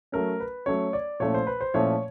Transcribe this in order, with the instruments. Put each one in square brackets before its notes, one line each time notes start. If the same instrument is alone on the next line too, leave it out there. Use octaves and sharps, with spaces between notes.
[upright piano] F#3 A3 C#4 [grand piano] A#4
[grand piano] B4
[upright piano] F#3 A3 C#4 [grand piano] C#5
[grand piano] D5
[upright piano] A#2 F3 A3 C#4 E4 [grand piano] C#5
[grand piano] C5
B4
C5
[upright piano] A#2 F3 A3 C#4 E4 [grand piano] C#5